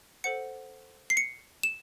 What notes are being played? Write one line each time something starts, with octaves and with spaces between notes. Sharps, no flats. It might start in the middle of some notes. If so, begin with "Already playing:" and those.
A4 C5 F#5 C#7
C7
C#7
E7